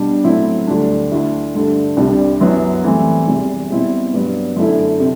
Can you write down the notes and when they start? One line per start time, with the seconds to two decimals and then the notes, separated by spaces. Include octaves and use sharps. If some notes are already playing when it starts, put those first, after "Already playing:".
Already playing: B2 G3 D4
0.24 A2 F#3 C4 E4
0.67 D2 D3 G3 D4
1.11 D2 D3 A3 E4
1.55 G2 D3 A3
1.97 C2 C3 G3 D4
2.41 F#2 F#3 B3 E4
2.83 A2 E3 G3 C4
3.27 E2 C3 G3
3.70 B2 G3 C4 E4
4.13 G2 F#3 B3
4.56 F#2 D3 A3 E4
5.00 C3